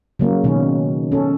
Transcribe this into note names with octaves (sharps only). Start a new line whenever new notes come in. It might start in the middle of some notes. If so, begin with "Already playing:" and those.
C#3 F#3 A#3
B2 D#3 C#4
C#4 A4